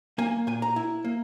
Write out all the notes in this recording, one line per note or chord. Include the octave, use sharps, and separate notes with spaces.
A#3 G#5
A#2 G#5
A#5
E4
A#3